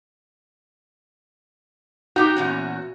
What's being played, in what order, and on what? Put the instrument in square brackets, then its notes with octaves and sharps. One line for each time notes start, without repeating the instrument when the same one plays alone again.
[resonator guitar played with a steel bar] D#4 G4 G5 [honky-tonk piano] F#4
[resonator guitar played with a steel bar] E2 A#2 C#4